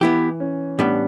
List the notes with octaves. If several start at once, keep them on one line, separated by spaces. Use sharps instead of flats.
E3 B3 E4 G4
C#4
A2 G3 B3 D4